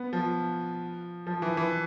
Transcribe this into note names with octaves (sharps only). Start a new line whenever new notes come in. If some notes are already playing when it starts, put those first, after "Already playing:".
Already playing: B3
F3
F3
E3
E3